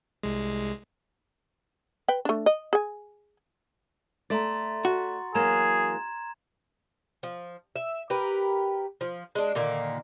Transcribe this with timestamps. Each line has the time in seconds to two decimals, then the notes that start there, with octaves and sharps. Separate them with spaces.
0.23 C2 G#3
2.08 B4 G5
2.25 A3 D4
2.46 D#5
2.73 G#4 G#5
4.30 A3 D5 A#5 C6 A6
4.85 F#4
5.35 E3 F#3 A#3 G#4 A#5 G#6 E7
7.23 F3
7.76 E5
8.10 G4 A#4 B4
9.01 F3
9.35 G#3 D4
9.55 A#2 D3 D#3 A#3